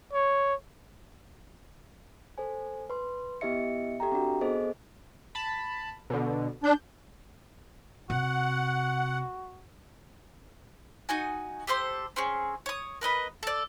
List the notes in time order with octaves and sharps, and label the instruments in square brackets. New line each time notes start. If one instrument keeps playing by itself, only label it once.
[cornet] C#5
[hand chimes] A4 C5 G#5
B4 C6
B3 E4 G4 D#5 E5 C#7
G4 A4 E5 G5 A#5
C4 D4 F#4
B3 G#4 A4 C5 D#5
[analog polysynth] A5 B5
B2 D3
[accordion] D4 [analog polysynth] G6
[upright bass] C3 [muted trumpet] F#4 [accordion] F#5
[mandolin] D#4 F#4 G#5
G4 A4 C5 C6
C4 C#4 G#4
C#5 D#6
A#4 B4 D#5 B5
A4 D5